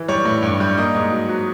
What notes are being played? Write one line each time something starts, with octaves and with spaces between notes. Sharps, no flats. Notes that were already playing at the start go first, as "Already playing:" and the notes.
Already playing: E3
G3 C#5
A2
G2
G3
A#3 D#5
G#2
F#3
F#3